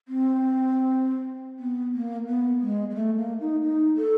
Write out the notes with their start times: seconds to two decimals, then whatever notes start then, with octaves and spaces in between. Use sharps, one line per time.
0.08 C4
1.59 B3
1.94 A#3
2.27 B3
2.61 G#3
2.90 G#3
2.95 A3
3.17 A#3
3.40 D#4
3.62 D#4
3.97 A4